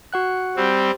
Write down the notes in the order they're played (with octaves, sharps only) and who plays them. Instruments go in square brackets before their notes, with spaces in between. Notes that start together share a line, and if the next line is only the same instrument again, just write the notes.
[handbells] F#4 F#5 F#6
[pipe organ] G3 C4